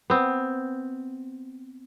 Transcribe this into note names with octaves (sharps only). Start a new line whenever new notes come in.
B3 C4